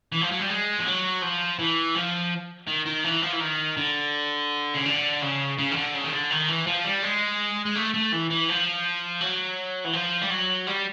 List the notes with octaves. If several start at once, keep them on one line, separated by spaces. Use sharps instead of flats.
E3
F3
F#3
G3
G#3
F3
F#3
F3
E3
F3
D#3
D#3
E3
F3
E3
D#3
D3
C#3
D3
C#3
C#3
D#3
D3
C#3
D#3
D3
D#3
E3
F3
G3
G#3
G#3
A3
A3
E3
E3
F3
F#3
E3
F3
G3
F#3
G3